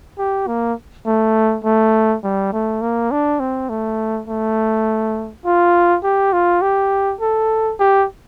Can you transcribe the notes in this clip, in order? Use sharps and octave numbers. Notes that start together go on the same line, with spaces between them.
G4
A#3
A3
A3
G3
A3
A#3
D4
C4
A3
A3
F4
G4
F4
G4
A4
G4